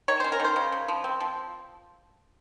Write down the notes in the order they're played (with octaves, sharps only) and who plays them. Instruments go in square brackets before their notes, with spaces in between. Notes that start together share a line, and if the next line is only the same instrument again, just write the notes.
[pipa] D#3 C#5
C#4 C5
A#4
D#3 C5
C#3
C#3
F3
C4
F3